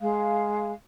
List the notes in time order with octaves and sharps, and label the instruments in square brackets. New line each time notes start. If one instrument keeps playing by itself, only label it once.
[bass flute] G#3 [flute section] F5